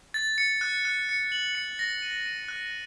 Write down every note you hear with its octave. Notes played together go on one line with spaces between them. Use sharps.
A6
C#7
F#6
F#6
C#7
F#7
C#7
A#6
D#7
D#7
F#6